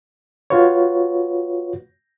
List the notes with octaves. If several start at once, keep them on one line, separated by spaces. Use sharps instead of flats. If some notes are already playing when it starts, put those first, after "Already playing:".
F4 F#4 B4 C#5